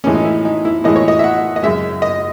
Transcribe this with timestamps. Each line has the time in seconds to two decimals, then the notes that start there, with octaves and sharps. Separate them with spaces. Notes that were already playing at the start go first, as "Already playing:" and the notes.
0.04 A2 E3 G#3 C#4
0.15 D#4
0.25 E4
0.45 D#4
0.65 E4
0.84 A2 E3 G#3 D#5
0.96 C#5
1.08 D#5
1.19 E5
1.24 F#5
1.56 D#5
1.63 F#2 C#3 G#3 E5
2.02 D#5